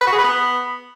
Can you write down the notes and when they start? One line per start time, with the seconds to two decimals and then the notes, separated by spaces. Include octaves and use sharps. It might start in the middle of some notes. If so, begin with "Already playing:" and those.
0.01 B4
0.07 F#4
0.13 G#4
0.18 B4
0.24 B3